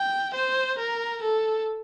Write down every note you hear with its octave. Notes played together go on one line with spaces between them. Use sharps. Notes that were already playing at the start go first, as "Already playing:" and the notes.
Already playing: G5
C5
A#4
A4